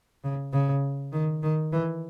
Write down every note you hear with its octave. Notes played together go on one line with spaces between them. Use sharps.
C#3
C#3
D#3
D#3
E3